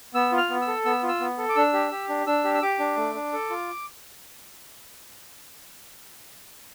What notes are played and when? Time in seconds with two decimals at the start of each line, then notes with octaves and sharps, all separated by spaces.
0.14 B3 E6
0.32 F4
0.38 F6
0.50 B3
0.62 E6
0.68 A4
0.85 B3 E6
1.03 F4
1.09 E6
1.20 B3
1.38 A4
1.49 D6
1.55 D4 E6
1.73 G4
1.91 G4
2.09 D4
2.26 D4 E6
2.44 G4
2.54 E6
2.62 G4 D6
2.79 D4
2.97 A3
3.15 D4
3.33 A4
3.50 F4